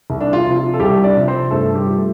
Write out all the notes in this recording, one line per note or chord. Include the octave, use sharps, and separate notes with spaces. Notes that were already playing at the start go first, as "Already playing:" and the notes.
C2
D4
F4
C3 F3
F4
A4
C2 G3 G4
D4 D5
C3 F3
C4 C5
G2 A3 A4
G3 G4
F3
A3